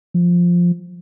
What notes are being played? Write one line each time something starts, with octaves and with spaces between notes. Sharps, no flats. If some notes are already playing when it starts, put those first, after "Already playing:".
F3